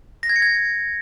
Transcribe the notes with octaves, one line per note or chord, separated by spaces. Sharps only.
A#6
G#6
C#7
G#6